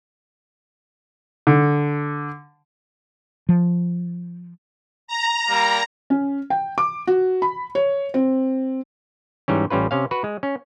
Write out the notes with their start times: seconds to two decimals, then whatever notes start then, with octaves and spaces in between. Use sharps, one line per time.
1.47 D3
3.49 F3
5.08 A#5
5.48 G3 A#3
6.10 C#4
6.50 G5
6.78 D6
7.07 F#4
7.42 B5
7.75 C#5
8.14 C4
9.48 G#2 E3 G3 C#4
9.70 A1 G3 C#4 F4 B4
9.91 C3 C#4 F5
10.11 F#4 B4 F#5
10.24 G#3
10.43 C#4